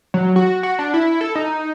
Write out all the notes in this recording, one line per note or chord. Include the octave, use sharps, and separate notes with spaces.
F#3
F#4
F#4
D4
E4
A4
D#4